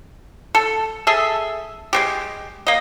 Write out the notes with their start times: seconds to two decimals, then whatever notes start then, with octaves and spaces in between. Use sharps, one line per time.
0.55 A4
1.07 G#4 A4 E5
1.93 G#3 C4 G4
2.67 A#3 D#5